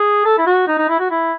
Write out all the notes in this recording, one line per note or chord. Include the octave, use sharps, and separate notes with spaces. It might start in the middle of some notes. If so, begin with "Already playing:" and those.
Already playing: G#4
A4
E4
F#4
D#4
D#4
E4
F#4
E4